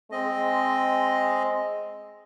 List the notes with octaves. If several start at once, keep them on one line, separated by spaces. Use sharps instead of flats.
G#3 C4 D#5